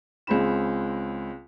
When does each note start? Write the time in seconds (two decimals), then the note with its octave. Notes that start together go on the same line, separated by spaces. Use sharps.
0.27 C#2 G#3 C4 B5 E7